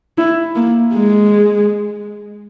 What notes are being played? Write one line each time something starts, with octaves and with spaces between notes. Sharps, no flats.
E4
A#3
G#3